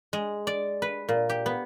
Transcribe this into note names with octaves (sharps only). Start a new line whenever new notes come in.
G#3
D5
B4
A#2
G4
B3